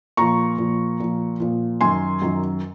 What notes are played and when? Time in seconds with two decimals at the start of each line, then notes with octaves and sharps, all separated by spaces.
0.17 A#2 F3 A#5 C#6
0.58 A#2 F3
1.00 A#2 F3
1.40 A#2 F3
1.81 F#2 D#3 F#3 G#5 C6
2.22 F#2 D#3 F#3